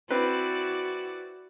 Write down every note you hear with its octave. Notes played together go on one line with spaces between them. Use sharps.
C4 E4 F#4 B4 D5